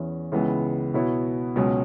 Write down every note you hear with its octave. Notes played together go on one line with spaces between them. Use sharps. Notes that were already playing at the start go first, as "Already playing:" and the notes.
Already playing: E2 E3 C#4
C#2 C#3 E3 B3
B2 B3 E4 C#5
C#2 B2 F#3 C#4